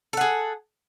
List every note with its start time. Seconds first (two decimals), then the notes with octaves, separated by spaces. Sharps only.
0.13 A4
0.17 F#5
0.21 G#4